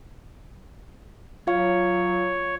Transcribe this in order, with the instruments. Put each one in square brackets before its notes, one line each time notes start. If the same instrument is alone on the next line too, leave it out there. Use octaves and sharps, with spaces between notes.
[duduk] F#3 [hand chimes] F4 F5 [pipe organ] C#5